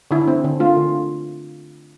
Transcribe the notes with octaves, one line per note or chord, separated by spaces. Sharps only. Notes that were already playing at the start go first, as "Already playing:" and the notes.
D3 E4
C4
D3
A3 F4
D3